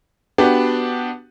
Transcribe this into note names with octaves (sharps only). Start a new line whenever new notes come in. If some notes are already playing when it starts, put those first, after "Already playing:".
B3 D4 F#4 G4